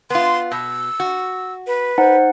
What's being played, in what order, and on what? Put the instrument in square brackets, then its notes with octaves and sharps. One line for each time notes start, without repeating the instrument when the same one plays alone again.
[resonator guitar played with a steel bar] B3 F4 [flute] C6
[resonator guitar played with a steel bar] B2 [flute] E6
[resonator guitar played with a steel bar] F#4
[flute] B4
[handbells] D#4 F#5 [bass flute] C5